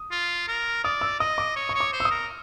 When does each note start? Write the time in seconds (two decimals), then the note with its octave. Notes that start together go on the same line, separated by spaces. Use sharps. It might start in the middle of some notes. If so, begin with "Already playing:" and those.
Already playing: D#6
0.11 F4
0.48 A#4
0.84 D5 D#6
1.01 E6
1.20 D#5 D#6
1.38 D6
1.56 C#5
1.69 C#6
1.75 C#5
1.80 D6
1.93 C5
2.00 E6
2.05 D#6
2.11 A#4